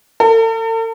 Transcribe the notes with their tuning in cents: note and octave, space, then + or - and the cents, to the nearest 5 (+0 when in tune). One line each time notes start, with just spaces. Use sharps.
A4 +45